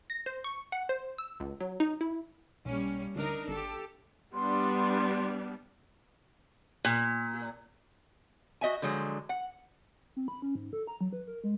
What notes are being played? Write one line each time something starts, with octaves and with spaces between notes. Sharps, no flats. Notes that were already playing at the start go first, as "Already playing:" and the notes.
A#6
C5
C#6
F#5
C5
E6
C#2
F#3
D#4
E4
B1 G3 A#3 C#4
D2 D4 D#4 A#4
G#1 G4 A4
G3 B3 D4 C6
A#2
F#4 D#5 E5 G#5
D3 F3 F#3 G#3
F#5
C4
B5
C#4
G#2
A4
A#5
F#3
B4
A#4
G#3